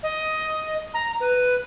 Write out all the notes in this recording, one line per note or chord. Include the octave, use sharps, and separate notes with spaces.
D#5
A#5
B4